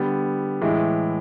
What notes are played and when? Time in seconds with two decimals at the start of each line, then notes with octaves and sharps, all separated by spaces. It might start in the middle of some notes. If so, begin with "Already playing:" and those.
Already playing: D3 G3 B3
0.61 A2 E3 G#3